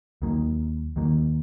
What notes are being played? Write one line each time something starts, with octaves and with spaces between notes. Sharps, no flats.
D#2 D#3 F#3 A#3
D#2 D#3 F#3 A#3